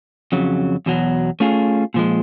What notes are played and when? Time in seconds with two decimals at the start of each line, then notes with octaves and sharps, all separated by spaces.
0.32 F2 C#3 F#3
0.86 E2 B2 F#3
1.40 A3 C#4 F4 G#4
1.94 A#2 F3 G#3